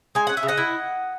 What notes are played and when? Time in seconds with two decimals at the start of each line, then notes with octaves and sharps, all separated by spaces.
0.15 G#3 G#5
0.27 C#4 F#5
0.37 E5
0.43 C#3
0.48 D#5 F#5
0.57 E4